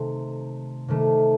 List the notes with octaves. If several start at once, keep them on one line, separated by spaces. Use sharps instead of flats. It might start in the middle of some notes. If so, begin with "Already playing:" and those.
Already playing: C3 D#3 A3 C4
C3 D#3 A3